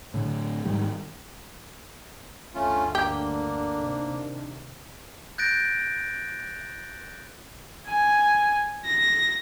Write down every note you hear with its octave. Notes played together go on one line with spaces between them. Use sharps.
A2 D3
G#2 D#3 G3
D2 G2 D3 A3 C#4 F4
A#3 D4 G4
C3 D#3
F#6 G6 A6 A#6 D7
G#5
A#6